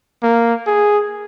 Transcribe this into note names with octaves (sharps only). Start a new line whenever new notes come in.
A#3
G#4